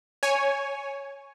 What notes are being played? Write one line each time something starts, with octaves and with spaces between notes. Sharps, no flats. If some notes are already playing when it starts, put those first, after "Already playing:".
C#5 G#5